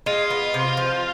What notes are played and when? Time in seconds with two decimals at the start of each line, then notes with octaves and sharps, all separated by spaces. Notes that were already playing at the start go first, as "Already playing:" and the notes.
0.06 G#3 F4
0.30 B3
0.54 C3
0.77 F3